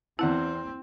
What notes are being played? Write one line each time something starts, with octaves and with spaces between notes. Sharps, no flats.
E2 C4 E4 F#5 A5